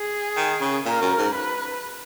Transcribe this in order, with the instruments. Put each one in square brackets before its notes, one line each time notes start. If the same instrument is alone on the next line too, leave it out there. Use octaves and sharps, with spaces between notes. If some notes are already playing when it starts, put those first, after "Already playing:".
Already playing: [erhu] G#4
[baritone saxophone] D#3
C#3
[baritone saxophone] A#2 [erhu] A#4
[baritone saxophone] F#2
G#2
[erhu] B4